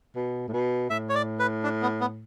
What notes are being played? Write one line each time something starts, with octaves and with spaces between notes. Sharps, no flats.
B2
A2
B2
A2 E5
C#5
D5
B4
D4
B3
B3